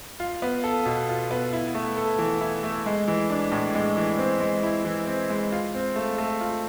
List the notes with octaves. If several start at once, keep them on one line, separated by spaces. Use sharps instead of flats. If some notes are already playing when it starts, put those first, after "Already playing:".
F4
B3
A4
B2
F4
B3
E4
A3
A4
E3
E4
A3
G#3
E3
D4
A2
G#3
E3
C4
G#3
E4
E3
C4
G#3
F4
C4
A3
A3
F4